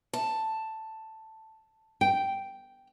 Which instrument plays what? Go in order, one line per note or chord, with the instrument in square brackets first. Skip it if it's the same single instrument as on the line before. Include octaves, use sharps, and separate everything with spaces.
[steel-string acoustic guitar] A5
[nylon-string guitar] G5